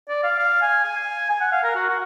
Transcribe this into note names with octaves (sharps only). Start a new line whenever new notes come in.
D5
F5
F5
G#5
G#5
G#5
F#5
F5
A#4
F#4
F#4